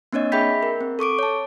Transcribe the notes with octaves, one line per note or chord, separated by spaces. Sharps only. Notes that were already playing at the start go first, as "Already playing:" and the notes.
A#3 C4 D4 C#5 D#5
G#4 E5 G5 B5 G6 B6
A#4
C4
A4 C#6 D6 D7
C#5 A5